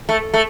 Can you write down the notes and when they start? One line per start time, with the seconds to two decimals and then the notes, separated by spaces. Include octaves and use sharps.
0.09 A3
0.34 A3